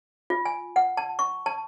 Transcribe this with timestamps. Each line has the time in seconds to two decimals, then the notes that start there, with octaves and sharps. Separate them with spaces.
0.30 F4
0.45 G#5
0.76 F#5
0.97 A5
1.19 C#6
1.46 A5